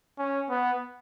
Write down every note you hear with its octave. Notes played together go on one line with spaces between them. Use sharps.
C#4
B3